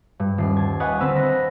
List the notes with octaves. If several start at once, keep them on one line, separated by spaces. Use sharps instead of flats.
G2
D#1 C7
A5 G#6
B4 D#5 F5 F#5 G#5 C#6
D3 C4 B4 E6 F6 D#7
D#5 B5 F#6 A#6